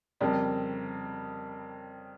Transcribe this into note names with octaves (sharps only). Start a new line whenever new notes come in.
F2 C#3 G3 A#3